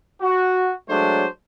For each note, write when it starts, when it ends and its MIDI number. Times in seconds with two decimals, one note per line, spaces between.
0.22 0.71 66
0.89 1.26 54
0.89 1.26 56
0.89 1.26 57
0.89 1.26 62
0.89 1.26 72
0.89 1.26 73